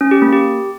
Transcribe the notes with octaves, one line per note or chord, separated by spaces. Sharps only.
C#4
G4
A#3
G4